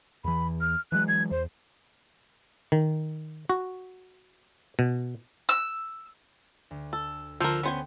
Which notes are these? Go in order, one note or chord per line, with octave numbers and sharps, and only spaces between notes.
E2 E3 B5
F6
E3 F#3 G#3 F#6
G#6
E2 C5
D#3
F#4
B2
E6
D2
A4
D3 F3 A4 A#4
B3 C#4 C5 G5 G#5 C6